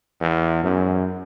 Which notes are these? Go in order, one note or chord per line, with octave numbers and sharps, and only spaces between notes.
E2
F#2